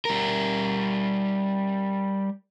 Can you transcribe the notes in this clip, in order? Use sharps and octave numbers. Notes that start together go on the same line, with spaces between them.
G3 A#4